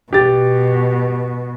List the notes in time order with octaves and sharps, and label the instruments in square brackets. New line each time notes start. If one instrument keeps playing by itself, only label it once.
[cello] B2 [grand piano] G4 A6